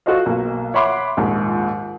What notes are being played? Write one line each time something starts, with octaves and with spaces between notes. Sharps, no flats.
F4 F#4 A4 C5 D#5 F5
B1 A#3
C#5 E5 F#5 B5 C6 D6
A#1 D#2 G#2